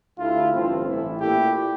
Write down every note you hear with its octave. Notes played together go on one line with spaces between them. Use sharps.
D2 D3 A3 E4 F4 G4
A1 G2 D3 A3 C4
A1 A2 E3 A3 E4
A#2 A3 E4 G4